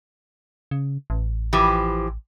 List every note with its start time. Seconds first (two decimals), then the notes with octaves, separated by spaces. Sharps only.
0.71 C#3
1.10 A1
1.53 E3 F3 G4